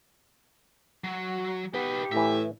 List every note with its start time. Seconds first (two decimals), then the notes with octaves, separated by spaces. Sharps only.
1.04 F#3 F#4
1.74 B3 D#4 G4 B4
2.12 A2 E3 E5 A#5